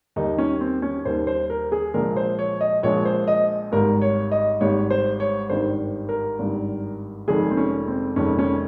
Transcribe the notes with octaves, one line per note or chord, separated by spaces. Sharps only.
D#2 D#3 G3 D#4
C#4
C4
C#4
D#2 D#3 G3 C5
C5
A#4
G#4
A#1 A#2 F3 G#3 A#4
C5
C#5
D#5
A#1 A#2 F3 G#3 C#5
C5
D#5
G#1 G#2 G3 A#4
C#5
D#5
G#1 G#2 G3 C#5
C5
C#5
G#1 G2 D#3 G3 C5
A#4
G#1 G2 D#3 G3
F1 F2 D#3 G#3 G#4
C4
C#4
C4
F1 F2 D#3 G#3 C#4
C#4